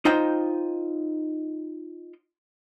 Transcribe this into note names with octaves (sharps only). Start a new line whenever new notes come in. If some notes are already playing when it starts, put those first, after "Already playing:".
D#4 F4 C5 D#5 G5